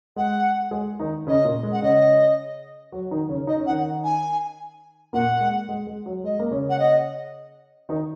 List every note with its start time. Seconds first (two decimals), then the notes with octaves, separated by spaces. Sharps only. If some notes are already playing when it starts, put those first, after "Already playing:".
0.16 G#3 F#5
0.71 G#3 G#4
1.00 D#3 D#4
1.27 C#3 C#4 D#5
1.45 A#2 A#3
1.63 G#3
1.72 F#5
1.82 C#3 C#4 D#5
2.92 F#3 F#4
3.11 D#3 D#4
3.29 C#3 C#4
3.47 D#4 D#5
3.60 C#4
3.66 F#5
3.70 D#3 D#4
4.03 G#5
5.13 A#2 A#3 F#5
5.41 G#3
5.69 G#3
5.87 G#3
6.06 F#3
6.24 G#3 D#5
6.39 A#3
6.51 C#3 C#4
6.69 F#5
6.79 D#5
7.89 D#3 D#4